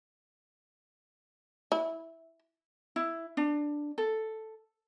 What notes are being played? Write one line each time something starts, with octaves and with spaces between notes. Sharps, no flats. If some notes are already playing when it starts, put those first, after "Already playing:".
E4
E4
D4
A4